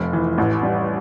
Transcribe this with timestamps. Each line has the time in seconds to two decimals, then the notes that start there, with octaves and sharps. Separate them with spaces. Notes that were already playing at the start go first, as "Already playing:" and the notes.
Already playing: F1 F3
0.13 E3
0.38 A1
0.63 G3